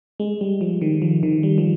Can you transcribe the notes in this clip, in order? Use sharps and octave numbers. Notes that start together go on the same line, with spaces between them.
G#3
G3
F3
D#3
F3
D#3
G3
F3